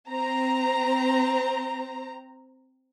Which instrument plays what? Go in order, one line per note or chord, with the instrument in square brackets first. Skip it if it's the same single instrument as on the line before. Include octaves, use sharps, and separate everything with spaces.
[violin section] C4 A#5